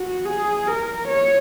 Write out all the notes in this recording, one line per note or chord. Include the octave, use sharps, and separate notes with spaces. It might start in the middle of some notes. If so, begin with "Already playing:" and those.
Already playing: F#4
G#4
A#4
C#5